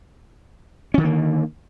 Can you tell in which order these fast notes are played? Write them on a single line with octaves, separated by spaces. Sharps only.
C#4 D#3 D3 A#3